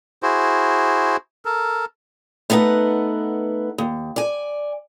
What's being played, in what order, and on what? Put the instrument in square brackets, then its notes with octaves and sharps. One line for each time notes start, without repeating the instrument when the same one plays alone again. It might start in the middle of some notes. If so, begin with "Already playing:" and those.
[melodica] E4 F#4 G#4 C5
A4 A#4
[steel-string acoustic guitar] A3 B3 D#4 B4 F#5
D#2
D5 G#5